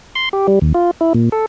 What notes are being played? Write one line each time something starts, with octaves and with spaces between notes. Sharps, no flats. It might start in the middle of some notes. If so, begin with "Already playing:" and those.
C6
G4
G3
D#2
F4
E4
A#2
A4